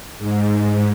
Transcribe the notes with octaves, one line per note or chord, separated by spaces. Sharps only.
G#2